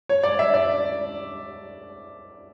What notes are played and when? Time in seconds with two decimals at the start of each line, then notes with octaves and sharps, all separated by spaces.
0.09 C#5
0.23 D5
0.39 E5
0.54 D5